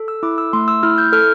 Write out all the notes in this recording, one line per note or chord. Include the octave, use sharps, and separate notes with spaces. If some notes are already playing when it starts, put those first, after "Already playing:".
Already playing: A4
E6
E4 D6
E6
A3 C6
E6
E4 F6
G6
A4 F6